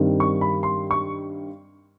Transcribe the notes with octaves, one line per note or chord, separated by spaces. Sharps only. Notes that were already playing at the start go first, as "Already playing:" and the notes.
Already playing: G2 D#3 G3 C4
C#6
B5
C6
C#6